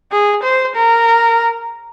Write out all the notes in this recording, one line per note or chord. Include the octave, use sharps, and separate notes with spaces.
G#4
C5
A#4